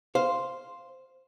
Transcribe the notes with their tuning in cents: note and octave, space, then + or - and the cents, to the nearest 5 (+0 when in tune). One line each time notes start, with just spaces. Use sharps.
C5 +0 F5 +0